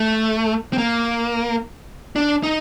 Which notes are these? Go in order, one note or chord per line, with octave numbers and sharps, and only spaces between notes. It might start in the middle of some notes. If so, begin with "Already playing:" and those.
Already playing: A3
C4
A#3
D4
D#4